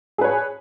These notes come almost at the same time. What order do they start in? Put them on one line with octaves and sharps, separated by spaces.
G#4 B4 C#5